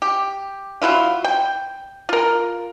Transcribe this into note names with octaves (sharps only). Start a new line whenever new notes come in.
G4
F#3 G3 E4 F4
G5
F4 A#4